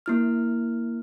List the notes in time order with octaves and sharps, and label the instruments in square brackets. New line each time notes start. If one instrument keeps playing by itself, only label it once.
[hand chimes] A#3 E4 F6